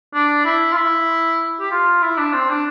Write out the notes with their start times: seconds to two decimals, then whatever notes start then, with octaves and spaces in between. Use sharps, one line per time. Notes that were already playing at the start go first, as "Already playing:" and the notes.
0.14 D4
0.45 E4
0.72 F4
0.76 E4
1.60 G4
1.71 F4
2.02 E4
2.18 D4
2.33 C4
2.49 D4